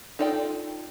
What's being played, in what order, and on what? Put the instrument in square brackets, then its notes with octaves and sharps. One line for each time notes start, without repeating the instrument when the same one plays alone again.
[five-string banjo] D#4 F4 A4 D5 G5